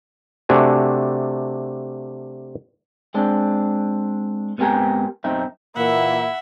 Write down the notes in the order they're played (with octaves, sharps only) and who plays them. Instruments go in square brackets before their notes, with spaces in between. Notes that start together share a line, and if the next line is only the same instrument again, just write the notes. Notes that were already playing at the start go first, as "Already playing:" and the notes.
[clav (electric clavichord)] C3 A3 D4 F#4 G#5
[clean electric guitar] G#3 C4 D4
G#2 B3 C4 G4 A#4 G#5
B1 F#2 C4 D#4 E5
[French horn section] A#2 E3 A#3 [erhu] E4 [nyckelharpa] E5 F#5